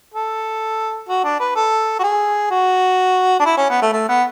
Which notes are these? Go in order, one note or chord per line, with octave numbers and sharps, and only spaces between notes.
A4
F#4
D4
B4
A4
F#4
G#4
F#4
D4
E4
C#4
B3
A3
A3
B3